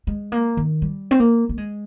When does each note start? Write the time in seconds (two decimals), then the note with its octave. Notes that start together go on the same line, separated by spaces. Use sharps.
0.07 G#3
0.32 A#3
0.57 D#3
0.82 G3
1.11 C4
1.20 A#3
1.49 A#3
1.58 G#3